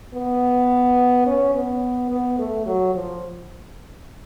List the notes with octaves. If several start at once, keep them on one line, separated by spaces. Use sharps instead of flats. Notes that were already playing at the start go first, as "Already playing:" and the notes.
B3
C#4
B3
B3
A3
F#3
F3